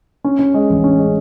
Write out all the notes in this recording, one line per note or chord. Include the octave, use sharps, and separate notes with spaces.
C#4
C#4
G#3
A1
C#4
G#3